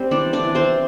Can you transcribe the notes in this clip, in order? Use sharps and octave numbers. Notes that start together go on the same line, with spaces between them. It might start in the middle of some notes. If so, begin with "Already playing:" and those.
Already playing: G3 C4 C5
E3 D4 D5
D4 D5
E3
C4 C5